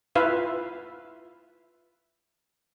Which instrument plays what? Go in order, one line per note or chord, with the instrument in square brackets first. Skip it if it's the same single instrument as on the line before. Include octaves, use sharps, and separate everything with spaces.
[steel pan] E4 F4 B4 E5 F5